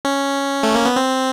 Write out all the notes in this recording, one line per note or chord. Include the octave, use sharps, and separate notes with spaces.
C#4
A3
A#3
B3
C4